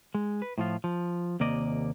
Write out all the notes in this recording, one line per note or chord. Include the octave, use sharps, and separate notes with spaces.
G#3
B4
A2 F3 F4
F3
D#2 C3 A#3 D5 D#5